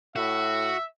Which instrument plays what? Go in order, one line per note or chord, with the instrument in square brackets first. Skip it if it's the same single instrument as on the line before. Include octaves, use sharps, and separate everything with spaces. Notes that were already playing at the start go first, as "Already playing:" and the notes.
[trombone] A2 [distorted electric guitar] F#4 [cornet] E5